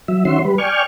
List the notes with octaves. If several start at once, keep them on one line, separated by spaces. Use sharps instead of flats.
F#3 E5
D#3 C#4 F#4 E5 C6
G3 B4
D5 G5 G#5 C#6 F6